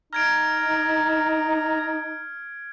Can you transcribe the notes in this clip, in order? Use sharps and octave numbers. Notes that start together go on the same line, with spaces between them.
D#4 A#5 F6 G#6 D7